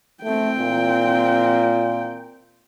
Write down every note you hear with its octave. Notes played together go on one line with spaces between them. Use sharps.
A3 C4 G5
A#2